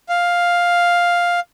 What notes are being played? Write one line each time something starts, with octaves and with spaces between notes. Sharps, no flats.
F5